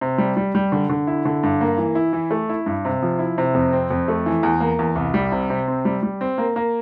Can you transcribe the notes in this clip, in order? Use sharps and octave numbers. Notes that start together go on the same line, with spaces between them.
C3
G3
G3
G3
D3
D3
E4
D3
G2
A#3
E3
E4
E3
A3
E4
G2
C3
F3
E4
C3
F2
C4
F2
A3
E3
E2
A#3
E2
C2
G3
C3
C3
C4
G3
G3
C4
A#3
A#3